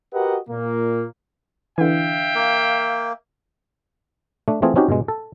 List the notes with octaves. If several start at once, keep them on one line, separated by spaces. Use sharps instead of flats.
F#4 G4 A#4 B4 D#5 F#5
A#2 A#3
D3 E3 E5 F5 G5
A#3
A3 D4
E3 A3 C4 F4 G#4
C4 C#4 D#4 F#4 G4
G2 B2 G#3
A4